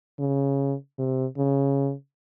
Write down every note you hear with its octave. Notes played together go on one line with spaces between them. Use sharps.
C#3
C3
C#3